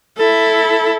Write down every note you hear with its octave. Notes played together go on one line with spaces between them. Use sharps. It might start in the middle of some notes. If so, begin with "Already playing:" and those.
E4 A4